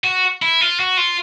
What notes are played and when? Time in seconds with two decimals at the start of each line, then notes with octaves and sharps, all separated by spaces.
0.04 F#4
0.42 E4
0.61 F4
0.80 F#4
0.98 F4